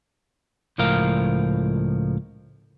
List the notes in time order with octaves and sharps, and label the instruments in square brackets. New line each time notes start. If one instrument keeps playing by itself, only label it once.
[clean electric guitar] C#2 A2 F3 A#4 F5